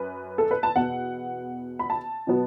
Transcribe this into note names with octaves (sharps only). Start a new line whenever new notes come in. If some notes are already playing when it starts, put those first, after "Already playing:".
Already playing: F#2 B4
A4
B4
A5
E2 B2 B3 F#5
B5
A5
B2 F#3 B3